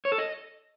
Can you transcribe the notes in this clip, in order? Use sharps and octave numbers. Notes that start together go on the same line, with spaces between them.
C#5
A4
D#5